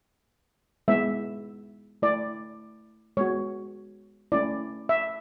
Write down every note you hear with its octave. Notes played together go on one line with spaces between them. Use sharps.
G#3 B3 E4 E5
A3 E4 D5
G#3 B3 F#4 C#5
A3 C#4 E4 D5
E5